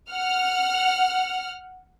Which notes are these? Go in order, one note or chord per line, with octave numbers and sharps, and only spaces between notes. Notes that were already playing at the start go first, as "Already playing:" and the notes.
F#5 F6